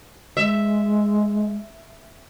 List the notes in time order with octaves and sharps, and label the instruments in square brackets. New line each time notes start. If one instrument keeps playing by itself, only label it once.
[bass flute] G#3 [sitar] E5